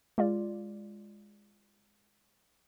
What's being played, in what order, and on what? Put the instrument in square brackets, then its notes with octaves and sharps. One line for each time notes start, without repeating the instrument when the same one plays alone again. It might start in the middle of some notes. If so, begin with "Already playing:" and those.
[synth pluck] G#3 F4 D5